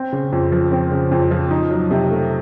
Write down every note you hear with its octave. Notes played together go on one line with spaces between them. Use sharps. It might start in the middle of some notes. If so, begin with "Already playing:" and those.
Already playing: C4
C#3
F2
F3
C4
C#3
F2
F3
D#4
F#3
C3
A3